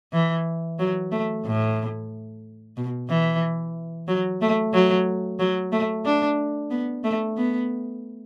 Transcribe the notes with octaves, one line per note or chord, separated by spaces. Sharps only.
E3
F#3
A3
A2
B2
E3
F#3
A3
F#3
F#3
A3
D4
B3
A3
B3